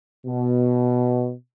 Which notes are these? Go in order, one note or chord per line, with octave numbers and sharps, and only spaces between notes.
B2